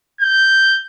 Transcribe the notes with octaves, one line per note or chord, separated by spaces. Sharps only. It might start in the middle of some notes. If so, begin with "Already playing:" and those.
G6